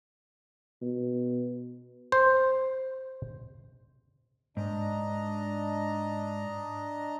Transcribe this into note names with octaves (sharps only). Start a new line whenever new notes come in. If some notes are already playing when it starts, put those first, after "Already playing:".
B2
C5
G#2 D4 D#5 A#5